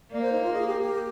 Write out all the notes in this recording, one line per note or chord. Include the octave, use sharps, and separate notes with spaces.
A#3 D5
C5
D#4
F4
G#4
G4
G4